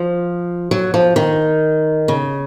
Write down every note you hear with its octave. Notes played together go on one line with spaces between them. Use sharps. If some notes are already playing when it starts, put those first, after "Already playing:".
Already playing: F3
F#3
F3
D#3
C#3